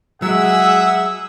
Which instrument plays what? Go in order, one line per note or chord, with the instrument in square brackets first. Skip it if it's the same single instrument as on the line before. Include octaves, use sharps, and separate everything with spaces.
[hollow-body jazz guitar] F#3 G#3 [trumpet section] G#4 E5 F#5 [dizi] E6